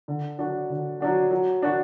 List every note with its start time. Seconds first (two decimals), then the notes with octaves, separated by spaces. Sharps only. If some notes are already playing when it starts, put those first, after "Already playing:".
0.08 D3
0.38 F#3 D4 F#4
0.70 D3
1.00 F#3 D4 F#4
1.31 F#3
1.62 D4 F#4